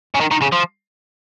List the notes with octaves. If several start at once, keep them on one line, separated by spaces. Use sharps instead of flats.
C#3
D#3
D#3
C#3
F3